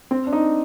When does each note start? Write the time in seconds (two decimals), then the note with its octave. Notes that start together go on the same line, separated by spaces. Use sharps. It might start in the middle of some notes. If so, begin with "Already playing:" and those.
0.11 C4
0.27 D4
0.33 D#4